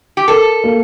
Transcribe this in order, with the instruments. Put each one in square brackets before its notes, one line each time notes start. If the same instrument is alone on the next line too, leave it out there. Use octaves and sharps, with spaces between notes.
[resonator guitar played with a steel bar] G4
[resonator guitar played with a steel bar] A4 [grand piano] A#4
[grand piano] A#3